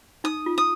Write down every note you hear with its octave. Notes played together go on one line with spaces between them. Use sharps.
D#4 D#6
F4
D#6